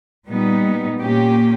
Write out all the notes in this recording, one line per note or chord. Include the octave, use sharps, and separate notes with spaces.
A#2 G3 B3 D#4
A#2 A#3 C#4 G4